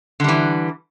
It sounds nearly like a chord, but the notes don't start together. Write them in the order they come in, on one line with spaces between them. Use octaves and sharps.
D3 G3 E3